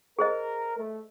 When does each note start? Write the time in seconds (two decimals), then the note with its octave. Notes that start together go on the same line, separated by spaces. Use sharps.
0.19 G#4 A#4 C5 D#5
0.78 A3